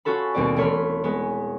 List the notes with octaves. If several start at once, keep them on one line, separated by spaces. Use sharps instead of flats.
C#4 F4 F#4 A4 B5
D#2 B2 G3 C4 D5
E1 A3 C#5 B5 C6 F6
G#3 B3